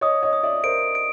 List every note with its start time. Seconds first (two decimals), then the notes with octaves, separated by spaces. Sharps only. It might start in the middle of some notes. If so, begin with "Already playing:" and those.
0.01 C#5 D#5 D#6
0.23 C#5 D#5
0.33 D#6
0.43 D5 E5
0.64 A#4 C5 D7
0.95 D7